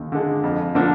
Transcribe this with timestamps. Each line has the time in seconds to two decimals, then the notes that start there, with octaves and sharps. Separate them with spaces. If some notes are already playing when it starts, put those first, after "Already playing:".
Already playing: D#2 D3
0.12 D3 G#3
0.43 F2
0.75 D3 F3 A#3 D4